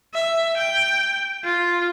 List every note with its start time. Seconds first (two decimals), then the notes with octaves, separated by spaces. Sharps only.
0.14 E5
0.57 G5
1.44 F4